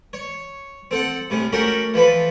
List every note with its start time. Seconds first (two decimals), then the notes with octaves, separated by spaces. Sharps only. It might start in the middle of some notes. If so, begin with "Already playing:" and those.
0.13 C#5
0.91 C4 A4 F#5
1.30 A2 C3 C#4
1.52 A3 C#4 F#4 G4 A4 A#4
1.94 E3 F3 A4 B4